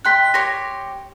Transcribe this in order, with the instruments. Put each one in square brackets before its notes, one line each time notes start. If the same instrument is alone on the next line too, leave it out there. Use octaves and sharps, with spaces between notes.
[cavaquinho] D#4 G5 C6 [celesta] F#6 B6
[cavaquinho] G4 C#5 C6 [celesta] A#6